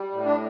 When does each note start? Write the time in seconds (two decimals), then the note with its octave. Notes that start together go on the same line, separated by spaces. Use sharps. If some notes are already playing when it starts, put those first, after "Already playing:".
Already playing: G3
0.12 A2
0.25 D4